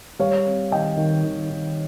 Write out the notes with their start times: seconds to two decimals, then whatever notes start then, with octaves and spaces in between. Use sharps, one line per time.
0.19 G3 C#5 F5
0.46 C4
0.71 D#3 D#5 G5
0.97 D#3
1.24 D#3
1.50 D#3